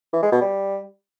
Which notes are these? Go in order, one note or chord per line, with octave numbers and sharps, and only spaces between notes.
E3
G#3
B2
G3